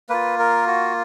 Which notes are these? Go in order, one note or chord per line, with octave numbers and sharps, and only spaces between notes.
A#3 F4 B4
A#4
F#4